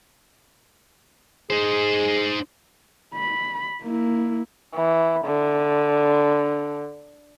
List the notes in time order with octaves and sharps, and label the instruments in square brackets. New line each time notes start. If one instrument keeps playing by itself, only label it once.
[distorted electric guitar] D#4 C5 [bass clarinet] G#4
[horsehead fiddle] B5
A#3 E4
[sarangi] E3
D3